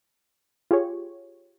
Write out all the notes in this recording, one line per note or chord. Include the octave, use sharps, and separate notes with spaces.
F4 G4 G#4 C#5